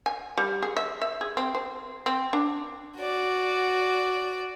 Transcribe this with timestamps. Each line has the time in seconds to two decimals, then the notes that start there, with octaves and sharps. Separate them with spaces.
0.06 G#5
0.38 G3
0.63 G#4
0.77 E5
1.02 E5
1.21 G#4
1.37 C4
1.55 C5
2.06 C4
2.33 D4
2.98 F#4 D5